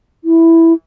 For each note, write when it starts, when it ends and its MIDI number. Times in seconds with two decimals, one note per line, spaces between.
0.24 0.73 64